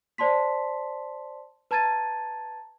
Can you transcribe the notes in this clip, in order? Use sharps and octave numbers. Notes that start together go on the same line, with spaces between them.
C5 D5 A5 C6 B6
B4 A5 A#5 G#6 A6 D#7